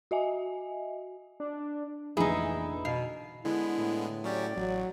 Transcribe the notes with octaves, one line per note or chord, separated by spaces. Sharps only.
F#4 D#5 E5 G#5
D4
F1 A#1 D3 E3 D#4 E4 G#4
B2 F5
D3 G#3 B3 E4
A2
F#3 C#4 G4 D5
A1 F#3